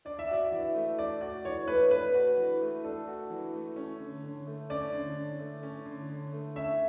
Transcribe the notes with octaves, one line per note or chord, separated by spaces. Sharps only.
D4 D5
E5
F#4 D5
E3 E5
A3
D4 D5
F#4 D5
E3 C#5
A3 B4
D4 B4
F#4
E3
A3
D4 A4
F#4
E3
A3
C#4
D3
D3
A3
C#4 D5
D3
D3
A3
C#4
D3
D3
A3
C#4 E5